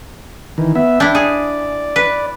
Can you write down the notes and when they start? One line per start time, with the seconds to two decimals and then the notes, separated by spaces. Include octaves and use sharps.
0.58 D#3 E3
0.75 B3 E5
1.00 D4 E4 G5
1.15 G#4 D5
1.96 B4